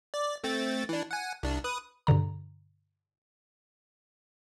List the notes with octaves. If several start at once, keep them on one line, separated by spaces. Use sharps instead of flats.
D5
A3 C4 A6
E3 D4
F#5 G#5
C2 D4
B4 D#6
G2 B2 D3 A#5